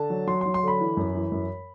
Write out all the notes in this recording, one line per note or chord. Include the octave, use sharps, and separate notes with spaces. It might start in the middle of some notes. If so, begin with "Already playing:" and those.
Already playing: D3 A5
F#3
F#3 C6
C6
F#3
C6
D3 B5
E3
F#2
E3
F#2